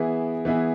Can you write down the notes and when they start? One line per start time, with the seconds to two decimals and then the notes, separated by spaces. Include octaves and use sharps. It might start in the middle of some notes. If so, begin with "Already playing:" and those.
Already playing: E3 B3 E4 G#4
0.45 E3 B3 E4 G#4